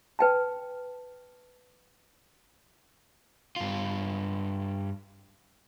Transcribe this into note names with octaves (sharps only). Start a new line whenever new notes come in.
B4 G5 A5
G2 F4